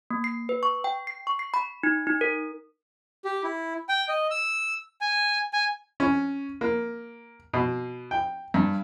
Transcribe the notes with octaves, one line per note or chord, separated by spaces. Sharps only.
A#3
C7
B4
C#6
G5
C7
C#6
C7
B5
D#4
D#4
A#4
G4
E4
G5
D#5
E6
G#5
G#5
C#4
A#3
B2
G5
G2